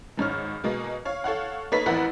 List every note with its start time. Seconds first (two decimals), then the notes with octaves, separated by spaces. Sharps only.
0.17 G#1 G#2 C#5 F6
0.64 B2 G#3 A#3
1.05 C#5 F5
1.24 A4 C#5 F5 F#5
1.72 A#3 D#4 A4 B4 C#5 B6
1.86 A1 F2 B3 E4 A#4 F#5